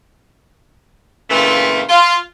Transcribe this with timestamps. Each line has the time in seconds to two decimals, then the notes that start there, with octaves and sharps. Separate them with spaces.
1.30 A#2 C#3 E3 A3 C4 F4
1.89 F4